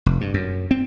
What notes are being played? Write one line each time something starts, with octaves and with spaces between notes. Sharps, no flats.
F1
G2
F#2
C4